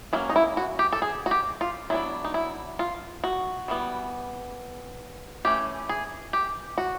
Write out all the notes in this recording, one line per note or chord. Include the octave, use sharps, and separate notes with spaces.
F#3 A#3 C#4 E4
D#4
E4
F#4
G4
A4
G#4
F#4
G4
F4
F#3 B3 D4 E4
D#4
E4
F4
F#4
E3 G3 B3
E3 A3 C#4 G4
G#4
G4
F#4